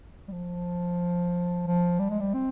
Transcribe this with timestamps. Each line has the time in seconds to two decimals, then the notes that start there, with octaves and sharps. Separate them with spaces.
0.28 G3
0.32 F3
1.67 F3
1.99 G3
2.10 G#3
2.20 G3
2.34 C4